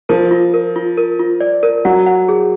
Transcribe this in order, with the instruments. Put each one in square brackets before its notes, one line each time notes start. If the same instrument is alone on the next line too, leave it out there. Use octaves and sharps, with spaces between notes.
[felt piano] F3 [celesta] A#4
[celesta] F4
A#4
F4
A#4
F4
D5
A#4
[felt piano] F#3 [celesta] F#5
[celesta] F#5
G#4